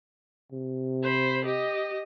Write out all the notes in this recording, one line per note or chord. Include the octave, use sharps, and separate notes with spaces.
C3
C5 B5
G4 D#5